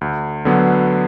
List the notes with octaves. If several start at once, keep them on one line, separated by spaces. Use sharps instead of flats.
D2
D3 F#3 B3